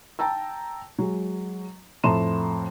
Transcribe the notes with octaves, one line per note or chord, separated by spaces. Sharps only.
G5 A5 A#5 E6
F#3 G#3
F2 A2 A3 A#5 C6 E7